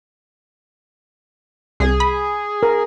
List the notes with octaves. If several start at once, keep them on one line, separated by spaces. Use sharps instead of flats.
C2 G#4
B5
A#4